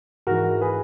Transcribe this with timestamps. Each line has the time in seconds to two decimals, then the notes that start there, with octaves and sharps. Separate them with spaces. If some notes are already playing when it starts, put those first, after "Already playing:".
0.27 G#2 E3 F#4 A#4
0.61 G#4 B4